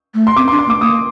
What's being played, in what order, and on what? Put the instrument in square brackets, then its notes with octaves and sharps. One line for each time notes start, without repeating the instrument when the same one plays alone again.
[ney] A3
[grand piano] C6
[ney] C4 [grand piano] D6
[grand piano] C6
[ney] D4
[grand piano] C6
[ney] A#3
[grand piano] D6
[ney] A#3 [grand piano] D#6